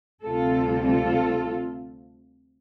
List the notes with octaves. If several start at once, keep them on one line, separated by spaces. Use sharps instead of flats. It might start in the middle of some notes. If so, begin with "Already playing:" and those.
D2 C3 G3 C4 F4 A4
F4 A4